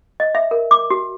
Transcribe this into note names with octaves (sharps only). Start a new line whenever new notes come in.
D#5
E5
A#4
D6
F#4